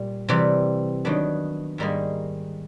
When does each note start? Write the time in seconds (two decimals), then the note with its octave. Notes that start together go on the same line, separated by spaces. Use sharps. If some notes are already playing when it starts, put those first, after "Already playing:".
Already playing: A#2 G3
0.29 C3 E3 G3
1.05 D#3 F#3 B3 D4
1.78 G#2 D#3 G3 A#3 D#4